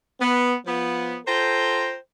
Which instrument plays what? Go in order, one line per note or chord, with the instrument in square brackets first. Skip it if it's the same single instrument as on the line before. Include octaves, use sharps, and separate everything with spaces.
[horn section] B3
F3 B3
F4 A4 C5 G5 A#5